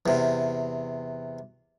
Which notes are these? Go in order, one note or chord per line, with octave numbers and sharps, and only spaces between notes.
E2 C3